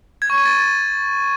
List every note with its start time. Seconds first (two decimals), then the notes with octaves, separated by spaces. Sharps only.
0.22 G#6
0.30 C#6
0.38 D#7
0.46 A6